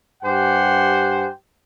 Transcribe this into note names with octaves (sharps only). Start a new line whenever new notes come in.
G2 G4 C5 F#5 G#5